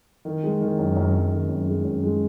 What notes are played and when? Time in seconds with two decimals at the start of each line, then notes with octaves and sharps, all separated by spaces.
0.25 D#3
0.44 G#3
0.61 D#3
0.79 F#2
0.97 F#2
1.14 F#2
1.32 D#3
1.49 F#2
1.68 G#3
1.85 F#2
2.03 G#3